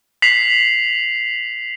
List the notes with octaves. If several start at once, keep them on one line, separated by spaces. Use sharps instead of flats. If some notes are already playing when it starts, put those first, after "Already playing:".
B6 C7 F7 F#7